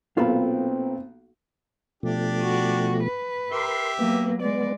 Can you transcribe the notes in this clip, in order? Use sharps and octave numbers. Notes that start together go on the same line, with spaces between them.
B1 A#2 C4 F4 A4 B4
B2 F3 A3 D4 G4
F#4
B4
G4 A#4 E5 C6
F#3 A#3 B3
G#3 D5